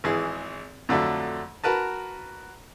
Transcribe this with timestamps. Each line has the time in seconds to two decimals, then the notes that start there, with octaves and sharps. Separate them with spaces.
0.04 G#1 E3 G#4
0.89 F2 D3 F#3 A3
1.64 F#4 A#4 B4 A5